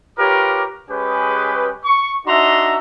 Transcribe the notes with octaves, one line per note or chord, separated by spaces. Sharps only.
F4 G4 A#4 B4 C#5 D6
G#3 C#4 G4 G#4 B4
C#6
D4 D#4 F#4 E5 A#5 C6